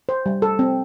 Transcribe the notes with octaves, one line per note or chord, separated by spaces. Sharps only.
C5
G3
A4
C4